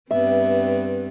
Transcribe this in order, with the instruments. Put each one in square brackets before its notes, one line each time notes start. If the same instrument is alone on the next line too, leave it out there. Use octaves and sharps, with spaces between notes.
[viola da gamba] G2 B3 C4 [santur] E5